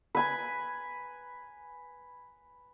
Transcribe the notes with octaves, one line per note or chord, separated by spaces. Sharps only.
B4 G#5 B5